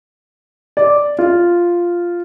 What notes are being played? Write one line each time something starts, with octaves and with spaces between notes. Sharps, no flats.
D5
F4